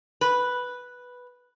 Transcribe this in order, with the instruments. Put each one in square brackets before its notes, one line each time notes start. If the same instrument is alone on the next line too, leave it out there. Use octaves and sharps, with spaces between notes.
[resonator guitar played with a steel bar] B4